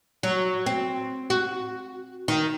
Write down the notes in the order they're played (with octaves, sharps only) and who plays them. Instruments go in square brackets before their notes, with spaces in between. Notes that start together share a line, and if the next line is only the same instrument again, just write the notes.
[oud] F#3
C4
F#4
D#3